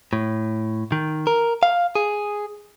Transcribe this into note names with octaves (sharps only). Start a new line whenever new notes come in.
A2
D#3
A#4
F5
G#4